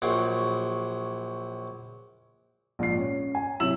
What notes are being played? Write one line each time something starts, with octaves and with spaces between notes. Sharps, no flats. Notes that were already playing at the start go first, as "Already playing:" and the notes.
A#1 F#3 G5 C6
A#1 G#2 C7
C#4
G#5
C3 F#3 E4 E6 E7 F#7